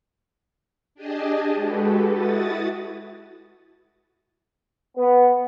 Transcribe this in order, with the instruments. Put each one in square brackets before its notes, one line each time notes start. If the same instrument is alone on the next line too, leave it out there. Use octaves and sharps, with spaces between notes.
[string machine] D4 G4 G#4 D#5 G#5 A5
G#3 F#4 G4 A4 B4
E4 F#4 D#6 A6
[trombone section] B3